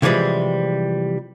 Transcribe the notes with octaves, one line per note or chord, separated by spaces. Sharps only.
C3 E3 F3 G3 G#3